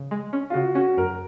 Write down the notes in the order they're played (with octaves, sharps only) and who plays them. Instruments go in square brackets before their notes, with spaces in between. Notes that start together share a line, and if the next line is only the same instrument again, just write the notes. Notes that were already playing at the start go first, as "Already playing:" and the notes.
Already playing: [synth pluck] C#3
G#3
C#4
[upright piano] F4
[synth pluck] C#3 [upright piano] F#4
[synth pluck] C#4 [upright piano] F#4
[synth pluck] F#2 [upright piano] A#4